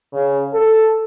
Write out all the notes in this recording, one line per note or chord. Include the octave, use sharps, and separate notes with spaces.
C#3
A4